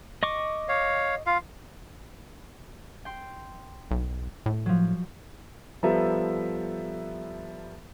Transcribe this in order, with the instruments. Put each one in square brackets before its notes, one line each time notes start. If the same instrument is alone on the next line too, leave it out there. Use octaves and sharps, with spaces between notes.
[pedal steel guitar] D#5 C#6 D6
[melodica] C#5 F5
F4 F5
[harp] G5 C6
[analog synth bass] B1
A2
[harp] F3 F#3
[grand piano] F3 G3 B3 A4 E5 A#5